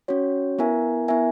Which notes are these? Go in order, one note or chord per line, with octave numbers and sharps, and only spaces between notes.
C#4 F#4 C#5
B3 E4 A#4 E5 G#5
B3 E4 A#4 E5 G#5